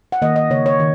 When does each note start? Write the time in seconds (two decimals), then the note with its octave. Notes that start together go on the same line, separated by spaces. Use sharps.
0.12 F#5
0.22 D#3 A#3 D#5
0.36 D#5
0.50 C#3 A#3 C#5
0.66 C#5
0.80 D#3